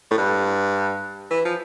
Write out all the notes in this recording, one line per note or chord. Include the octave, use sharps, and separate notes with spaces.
A2
G2
E3
F3